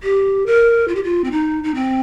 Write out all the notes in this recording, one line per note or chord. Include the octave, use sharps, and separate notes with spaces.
G4
A#4
F4
G4
F4
C4
D#4
D#4
C4